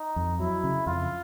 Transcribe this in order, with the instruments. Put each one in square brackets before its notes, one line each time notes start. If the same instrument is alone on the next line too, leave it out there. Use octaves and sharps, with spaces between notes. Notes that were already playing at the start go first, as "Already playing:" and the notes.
Already playing: [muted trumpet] D#4
[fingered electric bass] F2
[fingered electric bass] F#3 [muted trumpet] E4
[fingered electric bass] C#3
[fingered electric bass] F2 [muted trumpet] F4